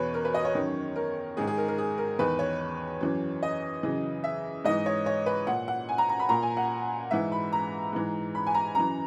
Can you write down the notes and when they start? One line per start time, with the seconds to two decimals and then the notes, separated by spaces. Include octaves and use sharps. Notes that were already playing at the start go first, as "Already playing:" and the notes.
Already playing: E2 B2 B4 C#5
0.14 A#4
0.25 B4
0.34 D#5
0.45 C#5
0.55 F#2 D#3
0.96 A#4
1.37 G#2 D#3 G#4
1.47 G#4
1.58 A#4
1.68 A#4
1.78 G#4
1.98 A#4
2.19 E2 D#3 B4
2.39 C#5
3.01 F#2 E3
3.43 D#5
3.83 F#2 C#3 E3
4.24 E5
4.65 G#2 E3 D#5
4.86 C#5
5.06 C#5
5.26 B4
5.47 A#2 F#5
5.68 F#5
5.89 G#5
5.98 A#5
6.09 A#5
6.19 B5
6.29 A#2 A#5
6.42 G#5
6.57 F#5
7.11 G#2 E3 E5
7.32 B5
7.53 A#5
7.93 G#2 E3
8.35 B5
8.47 G#5
8.54 A#5
8.75 F#2 E3 A#5